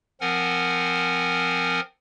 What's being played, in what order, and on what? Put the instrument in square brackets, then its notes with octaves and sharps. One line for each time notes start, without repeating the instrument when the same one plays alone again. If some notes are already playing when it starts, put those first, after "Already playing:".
[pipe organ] F3 C4 A#4 F#5 G#5